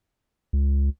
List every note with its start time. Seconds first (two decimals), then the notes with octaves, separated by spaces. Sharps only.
0.53 C#2